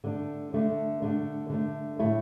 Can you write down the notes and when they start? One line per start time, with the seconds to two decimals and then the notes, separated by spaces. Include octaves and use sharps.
0.04 D3 A3 D4
0.53 D3 A3 D4
1.02 D3 A3 D4
1.50 D3 A3 D4
1.99 A2 A3 E4